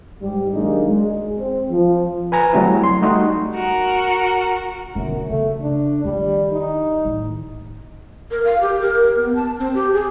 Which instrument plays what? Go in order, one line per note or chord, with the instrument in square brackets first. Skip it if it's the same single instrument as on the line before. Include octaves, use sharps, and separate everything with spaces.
[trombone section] G#2 G3
D#3 F#3 G#3 A#3 D4 D#4
G#3
C4
F3
[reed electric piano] B4 G#5 A#5
F#3 G3 A3 C4 E4
C6
G3 A3 D#4 F#4
[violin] F#4 A#4
[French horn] F#2 [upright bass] B2 D3
[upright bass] C#3 [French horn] A3
[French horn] D4
[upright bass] D#3 F3 [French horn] G3
[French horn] D#4
[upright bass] A2 D#3
[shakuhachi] A#4
F5
G4
A#4
B3
A5
C4
G4
G#4